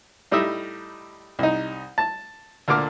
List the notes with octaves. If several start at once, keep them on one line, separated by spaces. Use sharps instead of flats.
A2 G3 D#4 D#5 E5
C2 D#4
A5
D2 A#2 D3 D6 F6